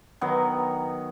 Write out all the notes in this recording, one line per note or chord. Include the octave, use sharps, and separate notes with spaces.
D#3 F#3 B3 D#4